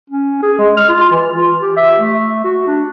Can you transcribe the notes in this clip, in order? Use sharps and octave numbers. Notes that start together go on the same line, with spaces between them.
C#4
G#4
G#3
F6
F4
E3
F4
G4
E5
A3
F#4
D4